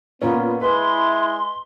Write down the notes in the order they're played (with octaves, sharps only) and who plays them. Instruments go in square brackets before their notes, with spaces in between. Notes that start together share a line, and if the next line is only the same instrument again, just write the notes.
[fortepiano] A#2 A#3 C#4 [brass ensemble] B3 [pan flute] F4
[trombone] G#3 [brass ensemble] E4 [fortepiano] B4 [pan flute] C6